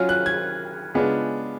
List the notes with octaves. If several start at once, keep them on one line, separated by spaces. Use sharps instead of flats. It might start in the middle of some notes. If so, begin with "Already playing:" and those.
Already playing: F#3 C#4 F4
F#6
G#6
C#3 G#3 B3 D4 F4